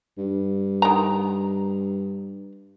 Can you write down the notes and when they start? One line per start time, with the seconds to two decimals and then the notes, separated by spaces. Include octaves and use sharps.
0.18 G2
0.82 D#3 A#5